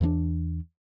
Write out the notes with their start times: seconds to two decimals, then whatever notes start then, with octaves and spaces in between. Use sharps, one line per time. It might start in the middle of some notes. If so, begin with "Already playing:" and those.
0.01 E2 E3 A3 D4